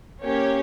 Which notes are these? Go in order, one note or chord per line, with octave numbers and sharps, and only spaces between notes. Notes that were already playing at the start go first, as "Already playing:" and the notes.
A#3 C#4 G4 C#5